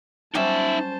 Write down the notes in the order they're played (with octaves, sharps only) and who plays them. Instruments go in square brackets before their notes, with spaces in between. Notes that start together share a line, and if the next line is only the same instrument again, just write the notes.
[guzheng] F#3 G3 C#4 [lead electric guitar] D#4 E5 [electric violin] C5 A5